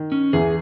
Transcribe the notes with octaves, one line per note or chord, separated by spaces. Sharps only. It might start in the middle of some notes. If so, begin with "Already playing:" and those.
Already playing: D#3
C#4
E2 E3 G#4